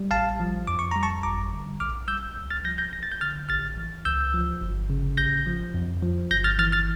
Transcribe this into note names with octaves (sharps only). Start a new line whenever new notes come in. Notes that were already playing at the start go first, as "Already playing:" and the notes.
Already playing: G3
A1 F5 A5
F3
F2 D6
C#6
G3 A#5
A5 C#6
G1 A#5 D6
D3
A#1 D6 F6
G3 E6 G6
C#2
F6 A6
F3 G6 A#6
G6 A#6
A1 A#6
A6
G6
D3 F6 A6
A1 F6 A6
E3
C#2 E6 G6
F3
G1
C#3
A1 G6 A#6
F3
F2
F3
G1 G6 A#6
F6 A6
E3 F6 A6
F6 A6